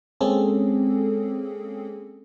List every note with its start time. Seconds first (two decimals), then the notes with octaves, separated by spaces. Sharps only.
0.21 G#3 A#3 C4 C#4 G#4 A4